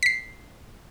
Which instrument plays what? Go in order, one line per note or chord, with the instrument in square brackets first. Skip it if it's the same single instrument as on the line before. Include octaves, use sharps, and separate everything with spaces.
[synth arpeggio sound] B6 C7